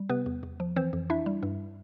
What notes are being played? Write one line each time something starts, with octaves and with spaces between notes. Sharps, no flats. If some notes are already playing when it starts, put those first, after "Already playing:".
Already playing: G3
C3 B3 B4
E2
E2
F3
E3 C4 C5
F2
D4 E4 E5
G3
G2